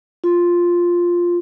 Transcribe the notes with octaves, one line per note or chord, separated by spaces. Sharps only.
F4